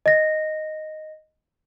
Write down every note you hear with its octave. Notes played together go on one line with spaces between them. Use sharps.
D#5 A#6